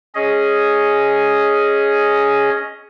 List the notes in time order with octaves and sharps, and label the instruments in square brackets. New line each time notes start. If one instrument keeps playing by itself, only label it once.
[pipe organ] C#4 G#4 D#5